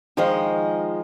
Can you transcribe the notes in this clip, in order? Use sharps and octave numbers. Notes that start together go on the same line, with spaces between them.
D#3 F3 G#3 G#4 D#5